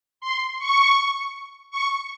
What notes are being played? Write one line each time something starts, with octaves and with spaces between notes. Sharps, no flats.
C6
C#6
C#6